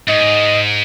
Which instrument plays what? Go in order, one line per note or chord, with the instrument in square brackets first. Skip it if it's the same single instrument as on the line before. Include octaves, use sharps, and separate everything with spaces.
[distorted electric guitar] G#2 [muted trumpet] D#5